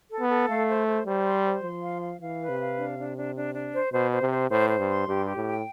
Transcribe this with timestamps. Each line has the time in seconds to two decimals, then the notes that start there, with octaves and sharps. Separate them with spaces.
0.11 A4
0.20 B3
0.30 A4
0.49 A3 F5
0.69 C5
0.87 C5
1.06 G3 C5
1.26 C6
1.45 C5
1.64 F3 C6
1.83 F5
2.01 F5
2.21 E3 F5
2.40 B4
2.49 C3
2.59 F5
2.78 D4
2.98 D4
3.17 D4
3.36 D4
3.55 D4
3.73 C5
3.93 B2 C5
4.12 C5
4.22 C3
4.31 C5
4.50 A2 C5
4.69 C5
4.78 G2
4.89 C6
5.08 G2 G4
5.27 G4
5.36 A2
5.47 G5